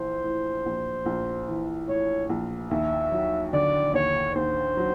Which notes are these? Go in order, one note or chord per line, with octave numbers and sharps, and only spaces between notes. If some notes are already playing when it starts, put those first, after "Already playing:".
Already playing: A#1 E3 C5
A2
A#1
A#1
E3
A2 C#5
A#1
D#2 E5
F#3
D3 D5
D#2 C#5
D#2 C5
F#3